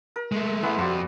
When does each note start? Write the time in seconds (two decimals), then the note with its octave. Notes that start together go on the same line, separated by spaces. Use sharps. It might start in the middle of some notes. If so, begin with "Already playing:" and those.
0.16 A#4
0.32 G#3 A3
0.63 E3 G#3 A3 B3 E5
0.78 F2 F3 F#4 D5